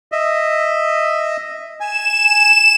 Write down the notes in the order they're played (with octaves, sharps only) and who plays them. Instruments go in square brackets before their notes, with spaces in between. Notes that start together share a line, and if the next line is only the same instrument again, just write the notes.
[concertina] D#5 E5
[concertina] G#5 [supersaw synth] E7